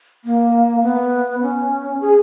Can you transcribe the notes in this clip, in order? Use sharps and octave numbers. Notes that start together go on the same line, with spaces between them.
A#3
B3
C#4
G#4